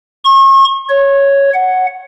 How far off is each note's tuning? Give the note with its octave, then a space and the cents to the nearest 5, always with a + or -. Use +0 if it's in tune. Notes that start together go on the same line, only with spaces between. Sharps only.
C#6 -40
C#5 +0
F#5 +0